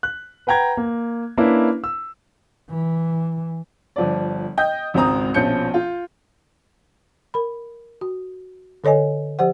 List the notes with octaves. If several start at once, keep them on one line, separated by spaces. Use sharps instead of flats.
F#6
B4 F#5 G5 A#5 G#6
A#3
A#3 C#4 D4 E4 B4 E5
E6
E3
G1 F3 D5
D#5 G5 G6
G#1 C#2 C4 A#5 D#6
A#1 B2 F3 C#4 G6 C#7
F4
A#4 B5
F#4
D3 A4 C#5 D#5 G#5
F3 G4 C5 F#5